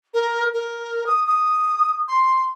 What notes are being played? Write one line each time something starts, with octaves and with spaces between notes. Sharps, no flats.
A#4
A#4
D#6
D#6
C6